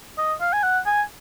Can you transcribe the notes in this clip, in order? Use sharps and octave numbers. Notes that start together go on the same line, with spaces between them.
D#5
F5
G#5
F#5
G#5